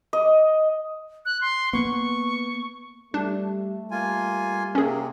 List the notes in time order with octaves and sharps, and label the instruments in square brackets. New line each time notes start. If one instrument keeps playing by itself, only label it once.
[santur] D#5
[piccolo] F#6
C6
[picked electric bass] A#3 B3 [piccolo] C#6
[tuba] G3 [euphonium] A3 [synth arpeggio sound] D4
[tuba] G3 [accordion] A#3 F4 G#5
[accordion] C3 C4 [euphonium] A#3 [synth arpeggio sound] C#4 G#4